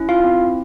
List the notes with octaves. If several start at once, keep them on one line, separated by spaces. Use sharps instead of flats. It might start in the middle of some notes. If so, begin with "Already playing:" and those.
Already playing: C#4 E4
F4 F5
C4